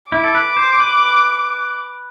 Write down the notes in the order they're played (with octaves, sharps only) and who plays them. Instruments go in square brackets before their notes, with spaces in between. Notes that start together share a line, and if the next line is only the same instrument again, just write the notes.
[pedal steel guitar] E4 [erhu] D6
[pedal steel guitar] A4
B4
C5
B4